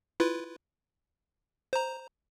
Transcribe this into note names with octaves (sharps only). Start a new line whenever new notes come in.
E4 F4 B4
C5 A#5